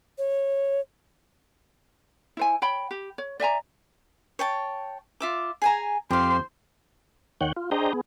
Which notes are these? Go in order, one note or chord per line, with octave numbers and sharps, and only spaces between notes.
C#5
E4 C5 G#5
C#5 G5 B5
G4
C#5
D5 E5 G#5 A#5
C#5 G5 A5
F4 E5 D6
G#4 G#5 A#5
F2 G4 C5 F5
D#2 D#3 C#5 F#5 G5
F4
D4 G#4 C5 D#5 G5 A#5
B3 G#4